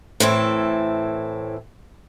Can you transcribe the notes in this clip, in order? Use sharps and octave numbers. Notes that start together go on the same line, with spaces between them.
A2 E3 C4 A4